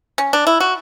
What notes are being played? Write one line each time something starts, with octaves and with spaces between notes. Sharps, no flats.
C#4
D4
E4
F#4